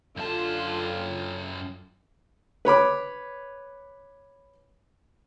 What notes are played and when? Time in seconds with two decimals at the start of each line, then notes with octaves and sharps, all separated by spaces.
0.17 F#2 D3 F4 A5
2.65 B4 C#5 B5 D6